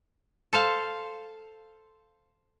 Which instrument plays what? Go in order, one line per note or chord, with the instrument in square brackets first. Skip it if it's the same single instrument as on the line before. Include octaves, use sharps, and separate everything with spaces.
[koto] A4 C5 F5 A5